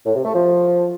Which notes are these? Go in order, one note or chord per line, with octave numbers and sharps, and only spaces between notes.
A2
C3
A3
F3